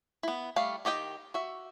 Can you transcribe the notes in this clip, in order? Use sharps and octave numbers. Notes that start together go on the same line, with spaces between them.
B3 E4
G3 A3 F5
D#3 G4 D#5 G5
F#4 E5